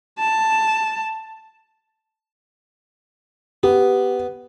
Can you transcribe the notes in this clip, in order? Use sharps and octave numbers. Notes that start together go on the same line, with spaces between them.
A5
B3 G4